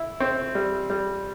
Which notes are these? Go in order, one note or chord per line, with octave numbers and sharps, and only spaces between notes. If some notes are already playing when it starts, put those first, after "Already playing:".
Already playing: E4
C4
G3
G3